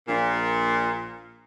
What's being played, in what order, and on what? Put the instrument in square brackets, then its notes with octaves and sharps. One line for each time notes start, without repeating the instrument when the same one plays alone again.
[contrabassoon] A#1 [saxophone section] A#2